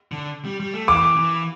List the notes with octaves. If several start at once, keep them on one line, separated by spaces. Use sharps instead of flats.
D3
G3
G3
A3
E3 D6
E3